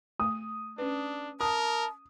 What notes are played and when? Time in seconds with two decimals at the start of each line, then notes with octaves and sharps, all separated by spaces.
0.20 A3 D#6
0.78 C#4 D4 B4
1.41 A#4 A5 D#6